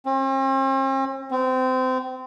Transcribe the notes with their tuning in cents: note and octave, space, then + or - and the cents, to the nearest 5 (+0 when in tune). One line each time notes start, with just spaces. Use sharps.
C4 +45
C4 -25